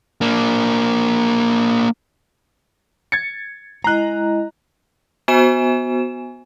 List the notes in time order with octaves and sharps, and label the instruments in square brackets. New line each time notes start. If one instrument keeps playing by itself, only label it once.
[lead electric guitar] A#3 D4
[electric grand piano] G#6 A6 C#7
[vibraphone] G#3 E4 D#5 [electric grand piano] A#5 F#6
[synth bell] B3 F#4 C5 G#5 E7